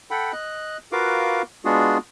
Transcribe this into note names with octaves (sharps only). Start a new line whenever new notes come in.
A4 F#5 G5 B5
D#5 F#6
F4 F#4 A#4 B4 F5 D6
G#3 B3 D4 F4 F#4 G#4